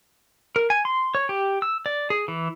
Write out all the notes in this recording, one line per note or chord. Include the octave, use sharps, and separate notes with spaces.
A#4
G#5
C6
C#5
G4
E6
D5
G#4
E3